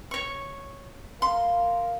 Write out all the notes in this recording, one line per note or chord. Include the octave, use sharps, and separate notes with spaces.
C#5 C#6
A#4 F5 C6